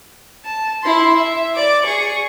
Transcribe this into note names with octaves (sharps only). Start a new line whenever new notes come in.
A5
E4 C6
E5
D5 D6
G#4 C#6